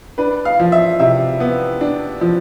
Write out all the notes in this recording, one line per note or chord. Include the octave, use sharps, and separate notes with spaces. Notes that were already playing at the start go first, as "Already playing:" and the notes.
D4 B4
F5
F3
E5
C3 E5
B3
D4
F3